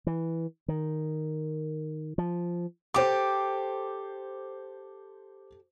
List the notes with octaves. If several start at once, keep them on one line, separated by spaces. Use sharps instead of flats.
E3
D#3
F3
G4 A4 C5 D6